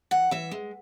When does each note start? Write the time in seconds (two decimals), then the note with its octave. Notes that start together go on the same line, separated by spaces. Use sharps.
0.11 E3 F#5
0.31 E3 E5
0.51 G#3